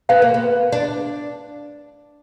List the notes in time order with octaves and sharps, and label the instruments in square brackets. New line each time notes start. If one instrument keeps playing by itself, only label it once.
[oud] B3 [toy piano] F5
[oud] A#3
B3
D4